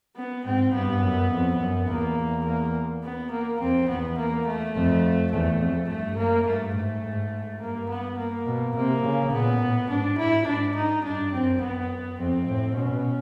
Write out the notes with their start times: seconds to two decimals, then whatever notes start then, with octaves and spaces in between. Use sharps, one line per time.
0.17 B3
0.45 G#2 C4
0.74 G2 B3
1.03 F#2
1.32 F2
1.60 F#2
1.88 E2 A#3
2.46 A#3
3.03 B3
3.32 A#3
3.60 F2 C4
3.89 E2 B3
4.18 A#3
4.46 A3
4.75 F2
5.32 E2 A3
5.61 F2
5.90 G2 A3
6.18 F#2 A#3
6.47 G2 A3
6.76 G#2 A3
7.04 G#2
7.61 G2 A#3
7.90 B3
8.19 A#3
8.47 B2
8.76 C3 A#3
9.04 C#3
9.33 A#2 B3
9.62 A2
9.90 G#2 D4
10.18 A2 E4
10.48 G#2 D4
10.76 D#4
11.05 G2 D4
11.33 F#2 C4
11.62 F#2 B3
12.19 F2 C4
12.47 A2
12.77 B2 C#4